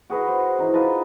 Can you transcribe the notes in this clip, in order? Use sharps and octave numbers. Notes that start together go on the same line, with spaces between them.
F#4 G#4 B4 D#5
C5
E3 D#4
F4 B4 D#5 A5